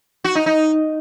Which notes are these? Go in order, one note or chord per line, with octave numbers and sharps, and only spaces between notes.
F#4
D#4
D#4